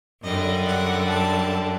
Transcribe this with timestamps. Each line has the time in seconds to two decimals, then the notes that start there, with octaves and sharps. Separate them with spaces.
0.22 F#2 D3 G3 D#5
0.66 F#5
1.08 A5